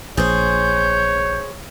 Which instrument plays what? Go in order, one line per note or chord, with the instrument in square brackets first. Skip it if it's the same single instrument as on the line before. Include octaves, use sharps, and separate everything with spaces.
[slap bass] A#1 [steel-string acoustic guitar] G#4 C5 [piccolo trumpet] C#5 [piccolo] G6